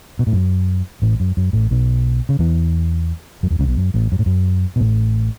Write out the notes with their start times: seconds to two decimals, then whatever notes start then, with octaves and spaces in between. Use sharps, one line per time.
0.19 B2
0.27 A2
0.33 F#2
1.02 A1 A2
1.20 F#2
1.37 F#2
1.53 A1 A2
1.71 B1 B2
2.29 C#3
2.39 E2 E3
3.43 F#2 F#3
3.51 E2 E3
3.59 C#2 C#3
3.68 B1 B2
3.77 F#2
3.94 A1 A2
4.12 F#2
4.19 A2
4.26 F#2
4.76 B2
4.79 A1 A2